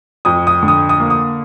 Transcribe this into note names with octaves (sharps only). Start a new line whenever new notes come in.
F2 D#6
D#6
D3
D#6
D#6
A#3
D#6